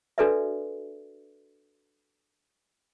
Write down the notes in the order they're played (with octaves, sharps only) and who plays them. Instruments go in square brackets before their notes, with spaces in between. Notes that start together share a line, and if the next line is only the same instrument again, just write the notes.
[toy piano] D4 F#4 A4 B4 D5 E5